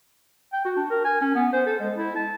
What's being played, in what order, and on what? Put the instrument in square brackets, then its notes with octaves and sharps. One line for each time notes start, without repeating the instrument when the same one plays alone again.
[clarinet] G5
F#4
D4
A#4
G#5
C#4
B3
C5
A4
G#3
E4
A5